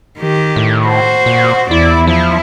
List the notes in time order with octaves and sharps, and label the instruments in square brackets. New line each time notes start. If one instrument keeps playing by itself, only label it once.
[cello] D#3 G4
[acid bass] A2
[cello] F#4 C5
[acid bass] A#2
[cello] E2 D5 [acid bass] E4
[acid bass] F3 [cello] E4